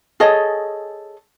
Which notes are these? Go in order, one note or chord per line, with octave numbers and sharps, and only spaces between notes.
G#4 A4 C#5 D#5